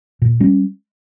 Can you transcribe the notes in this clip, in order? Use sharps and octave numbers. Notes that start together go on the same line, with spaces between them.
A#2
G3 C#4